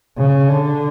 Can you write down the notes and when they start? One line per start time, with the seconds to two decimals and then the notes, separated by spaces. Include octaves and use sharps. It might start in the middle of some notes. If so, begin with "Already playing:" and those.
0.17 C#3
0.49 D3